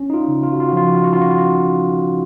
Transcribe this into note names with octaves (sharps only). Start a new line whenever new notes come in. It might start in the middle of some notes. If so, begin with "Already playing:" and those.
Already playing: C#4
D#4
F4
C#3
F4
F#4
F4
F3 F#4
F4
F#4
F4
F#4
F4
C#4 F#4
F4
F#4